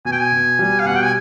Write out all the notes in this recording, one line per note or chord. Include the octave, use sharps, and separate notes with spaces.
B2 G#5
G5
G#5
B2
G3
F5
B2 F#5
G5
G#5